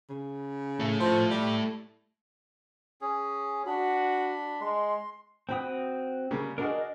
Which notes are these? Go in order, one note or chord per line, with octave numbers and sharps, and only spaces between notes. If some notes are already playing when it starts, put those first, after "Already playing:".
C#3
A3 E4
F3
G3
C#4 G#4
D4 F#4 B5
G#3 C6
C4 F#4 G5 B5 D#6
C#3 G3 A#3
D4 F#4 G#4 A#4 D#5